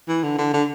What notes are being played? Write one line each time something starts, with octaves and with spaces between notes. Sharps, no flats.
E3
D3
D3
D3